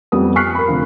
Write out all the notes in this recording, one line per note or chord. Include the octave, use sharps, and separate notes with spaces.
F2 G3 B3 D#6
C#6 F6 F#6 B6 C7
A#4 B5
F1 D3 F3